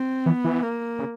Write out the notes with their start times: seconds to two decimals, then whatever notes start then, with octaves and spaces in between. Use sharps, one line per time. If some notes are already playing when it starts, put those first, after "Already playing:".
Already playing: C4
0.26 E3 B3
0.44 E3
0.63 A#3
0.99 C#3